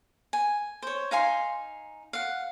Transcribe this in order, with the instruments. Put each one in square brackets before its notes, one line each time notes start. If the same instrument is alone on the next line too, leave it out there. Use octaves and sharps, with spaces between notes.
[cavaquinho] G#5
C5 C#5
D#4 F5 G#5 C6
F5 F#5